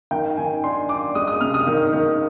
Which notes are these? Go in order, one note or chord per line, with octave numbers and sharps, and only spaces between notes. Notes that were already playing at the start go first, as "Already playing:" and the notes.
D#3 G5
D#3 G#5
D4 C6
D4 D6
G#3 D#6
D#6
C3 F6
D#6
D#3
D#3